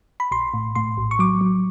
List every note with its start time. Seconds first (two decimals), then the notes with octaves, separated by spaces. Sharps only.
0.20 B5
0.31 A#1 C6
0.54 A2
0.75 A2 C6
0.97 A#1
1.11 C#6
1.19 F#3 D6
1.41 F#3